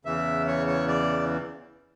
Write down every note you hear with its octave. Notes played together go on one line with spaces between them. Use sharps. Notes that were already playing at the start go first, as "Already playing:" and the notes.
E2 C#3 E3 E5
C#5
C#5
D5